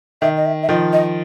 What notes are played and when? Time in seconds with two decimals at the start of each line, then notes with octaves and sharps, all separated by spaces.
0.22 D#3 E5
0.37 D#5
0.46 E5
0.63 E5
0.69 D#3 F3 D#5
0.93 D#5